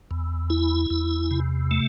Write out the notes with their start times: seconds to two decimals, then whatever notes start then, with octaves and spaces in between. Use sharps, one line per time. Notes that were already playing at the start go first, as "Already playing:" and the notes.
0.11 E2
0.50 E4
0.90 E2
1.31 C3
1.71 A3